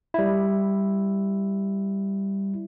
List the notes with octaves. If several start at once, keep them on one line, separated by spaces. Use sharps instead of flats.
G3 E4